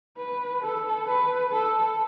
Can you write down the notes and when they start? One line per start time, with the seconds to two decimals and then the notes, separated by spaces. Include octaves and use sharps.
0.18 B4
0.63 A4
1.07 B4
1.52 A4